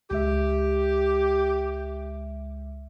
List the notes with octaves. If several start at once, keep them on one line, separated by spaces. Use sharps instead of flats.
C#2 G#3 G4 E5